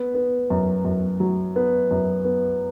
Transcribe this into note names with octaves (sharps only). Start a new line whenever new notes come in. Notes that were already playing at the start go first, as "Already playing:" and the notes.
Already playing: B3
B3
F#2
F#2
F#3
B3
F#2
B3